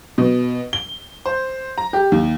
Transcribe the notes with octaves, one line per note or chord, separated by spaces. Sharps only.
B2
G7
C5
A#5
G4
D#2